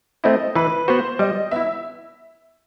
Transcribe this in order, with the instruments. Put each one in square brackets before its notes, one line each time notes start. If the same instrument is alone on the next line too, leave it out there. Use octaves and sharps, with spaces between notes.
[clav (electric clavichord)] A3 C4 E4 [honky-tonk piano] D#5
[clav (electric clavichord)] E3 [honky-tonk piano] B4
[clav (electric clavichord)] B3 F#4 [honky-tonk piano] C5
[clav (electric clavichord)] G3 [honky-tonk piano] D#5
[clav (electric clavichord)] B3 E4 [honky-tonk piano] E5